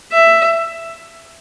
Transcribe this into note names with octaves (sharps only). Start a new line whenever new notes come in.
E5